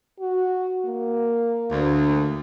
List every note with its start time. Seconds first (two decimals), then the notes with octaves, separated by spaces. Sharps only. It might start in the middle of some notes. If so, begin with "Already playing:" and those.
0.20 F#4
0.85 A#3
1.71 D2